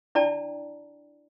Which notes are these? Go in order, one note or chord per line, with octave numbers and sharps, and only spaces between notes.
D4 E4 D5 G5 A5 A#5